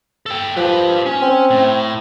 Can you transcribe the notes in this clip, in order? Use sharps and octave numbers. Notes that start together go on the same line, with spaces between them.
A4 G5
F3 G4 B4
C#4
C4
A2